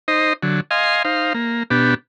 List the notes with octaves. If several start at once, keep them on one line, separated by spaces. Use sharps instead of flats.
D#4 C5 D#5
D3 F#3
D#5 F5 G#5 C6
D#4 C5 F5
A#3
B2 B3 D4 G4